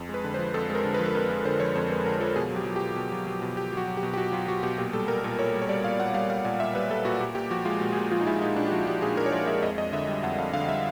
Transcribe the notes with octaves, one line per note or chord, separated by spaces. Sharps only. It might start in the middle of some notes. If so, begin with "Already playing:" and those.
Already playing: F2
G#3
B4
D3
C5
F3
F2 A4
G#3
A#4
D3
B4
F3
A4
F2 A#4
G#3
D3 C5
F3 C#5
F2 C5
G#3 B4
D3 A#4
F3 A4
B2 G#4
F#3
G4
F#3
G4
B2
B2
F#3
F#3
B2
B2 G4
F#3 F#4
F#3
G4
B2
G4
B2 F#4
F#3 F4
F#3 F#4
B2 G4
A#2 G4
G3 A4
G3 A#4
A#2
A#2 C#5
G3
C#5
G3 D5
A#2 F5
A#2 F#5
G3 F5
G3 F5
A#2 F5
A#2 E5
G3 B4
G3 A4
A#2 F#4
A#2 G4
A#2 G4
F3 F#4
G#3 F4
A#2 F#4
G#4
A#2 G4
F3 F4
D#4
G#3 E4
A#2 D#4
A#2 D4
G4
F3 F#4
G#3 G4
A#2 G#4
A#2 A#4
C#5
F3 D5
G#3 E5
F2 D#5
F2 D#5
D3 E5
G3
F2 F#5
F2 F5
D3 F5
G3 E5